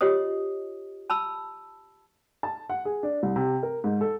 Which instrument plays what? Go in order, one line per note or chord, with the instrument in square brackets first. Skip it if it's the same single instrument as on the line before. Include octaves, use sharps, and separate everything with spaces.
[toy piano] F4 G4 C#5 D#5 D#6
A5 B5 E6
[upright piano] A5
F#5
G#4
D4
C2
C3
A#4
G#2
A4